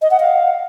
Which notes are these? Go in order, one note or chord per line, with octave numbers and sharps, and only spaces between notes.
D#5
F#5
F5